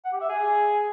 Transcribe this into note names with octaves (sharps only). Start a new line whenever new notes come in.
F#5
G4
E5
G#4